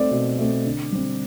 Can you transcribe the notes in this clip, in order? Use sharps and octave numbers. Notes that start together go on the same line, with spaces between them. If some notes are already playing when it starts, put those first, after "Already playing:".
Already playing: A3 C4 D5
B2
A3 C4
D3
G3 C4